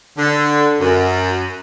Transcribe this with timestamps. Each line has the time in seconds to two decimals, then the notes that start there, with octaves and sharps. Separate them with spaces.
0.17 D3
0.80 F#2